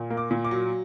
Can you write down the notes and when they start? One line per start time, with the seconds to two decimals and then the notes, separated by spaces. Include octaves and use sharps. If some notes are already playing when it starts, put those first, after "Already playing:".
Already playing: A#2
0.10 A#3
0.17 D6
0.31 A#2
0.44 D6
0.51 F#3